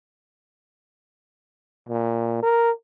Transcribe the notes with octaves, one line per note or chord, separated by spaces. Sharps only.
A#2
A#4